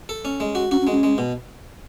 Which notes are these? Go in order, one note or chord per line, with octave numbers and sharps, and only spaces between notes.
A4
C#4
G#3
F#4
C#4 F#4
C#4
G#3
C#4
G#3
B2